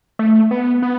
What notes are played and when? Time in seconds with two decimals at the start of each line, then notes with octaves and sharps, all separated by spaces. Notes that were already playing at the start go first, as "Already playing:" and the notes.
0.19 A3
0.51 B3
0.82 B3